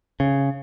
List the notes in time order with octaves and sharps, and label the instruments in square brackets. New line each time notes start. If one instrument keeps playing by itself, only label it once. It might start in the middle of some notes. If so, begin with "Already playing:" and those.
[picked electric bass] C#3